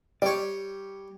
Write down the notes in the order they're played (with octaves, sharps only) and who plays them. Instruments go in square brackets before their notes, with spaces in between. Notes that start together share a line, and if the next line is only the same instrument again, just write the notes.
[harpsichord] G3 C#5 [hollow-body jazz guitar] D5